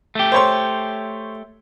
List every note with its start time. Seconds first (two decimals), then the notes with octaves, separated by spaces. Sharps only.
0.15 A3 G4
0.32 C5 C#5 C6